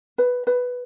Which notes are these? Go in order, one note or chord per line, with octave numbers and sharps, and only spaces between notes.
B4
B4